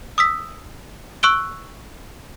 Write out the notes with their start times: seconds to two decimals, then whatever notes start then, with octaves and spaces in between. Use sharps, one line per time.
0.18 D#6 E6 B6
1.23 C#6 E6 F#6 D7 G7